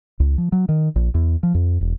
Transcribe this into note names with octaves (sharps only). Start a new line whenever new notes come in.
C#2
F3
F#3
D#3
A#1
E2
F3
F2
E1